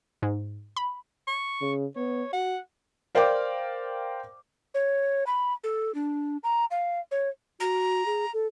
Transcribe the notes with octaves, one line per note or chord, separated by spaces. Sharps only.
G#2
B5
C#6
C#3
B3 C#5
F#4 F#5
A#4 C5 D5 F5 G5 D6
C#5
B5
A4
D4
A#5
F5
C#5
F#4 A#5
G#4
A4